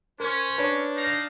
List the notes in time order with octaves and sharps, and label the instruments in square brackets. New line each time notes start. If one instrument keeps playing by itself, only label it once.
[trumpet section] C#4 [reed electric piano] A#4 [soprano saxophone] C5
[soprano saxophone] D4 [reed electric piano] B4 C#5
[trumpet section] D#4 F5 A#5